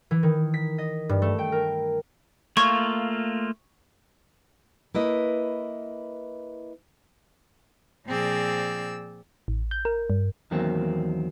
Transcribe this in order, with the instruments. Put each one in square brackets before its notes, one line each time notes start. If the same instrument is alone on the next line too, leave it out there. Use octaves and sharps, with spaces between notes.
[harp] E3
D#3
B6
D#5
G2
A3
G5
A#4
[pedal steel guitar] A3 A#3 F4 [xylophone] C#6 G#6
[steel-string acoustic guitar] A#3 E4 B4 D#5
[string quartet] A#2 F3 C4 G#4 D5 E6
[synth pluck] A1
G6
A#4
G2
[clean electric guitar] E2 D#3 F#3 A#3 C4